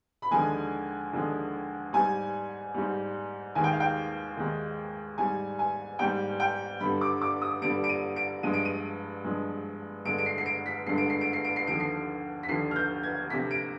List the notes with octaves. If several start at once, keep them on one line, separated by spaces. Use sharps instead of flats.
B5
D#2 D3 F3 G#3 G#5
D#2 D3 F3 G#3
G#2 G3 G#5
G#2 G3
D#2 D#3 G#3 G#5
G5
F5
G5
D#2 D#3 G#3
G#2 G3 G#5
G#5
G#2 G3 G5
G5
G2 D3 G3 B5
D6
D6
D#6
G2 D3 G3 D7
D7
D#7
D7
G2 F3 G#3 D#7
D7
D#7
G2 F3 G#3
G2 D3 G#3 D7
D7
C7
C7
D7
B6
G2 D3 G#3 C7
D7
C7
D7
C7
D7
C7
D#2 D3 F3 D7
C7
B6
D#2 D3 F3 C7
F6
G6
G#6
D2 C3 F3 B6
D7